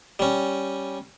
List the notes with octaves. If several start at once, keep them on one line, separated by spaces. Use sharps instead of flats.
G3 C#4